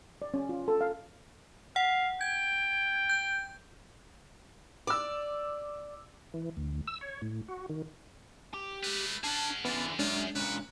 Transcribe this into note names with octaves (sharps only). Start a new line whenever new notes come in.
D5
C#4
F4
A4
F5
F5 F#5
G5 G#6
G6
D5 D6 E6
E3
D2
E6
C#5
A2
F#4
D#3
G4
G#3 A3 B4
C#4 D4 G#4 F#5 A5
D3 E3 B3 C#4 F4 A6
F#2 G#3 C#4 D4 F4
C#2 A#2 B4